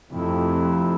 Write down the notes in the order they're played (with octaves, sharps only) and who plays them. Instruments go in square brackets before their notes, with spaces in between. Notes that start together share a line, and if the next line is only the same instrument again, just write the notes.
[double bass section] F2 [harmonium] C3 F3 A3 C4 E4